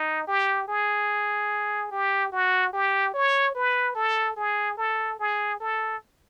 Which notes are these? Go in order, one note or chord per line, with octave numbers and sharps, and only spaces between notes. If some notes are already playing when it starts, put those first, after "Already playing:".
Already playing: D#4
G4
G#4
G4
F#4
G4
C#5
B4
A4
G#4
A4
G#4
A4